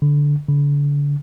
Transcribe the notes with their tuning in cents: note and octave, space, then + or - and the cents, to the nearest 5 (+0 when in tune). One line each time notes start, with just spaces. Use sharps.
D3 -10
D3 -35